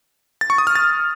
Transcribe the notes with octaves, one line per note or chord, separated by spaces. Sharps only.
A6
C#6
D#6
F6
A6